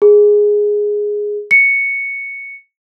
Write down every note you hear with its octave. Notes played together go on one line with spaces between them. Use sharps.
G#4
C#7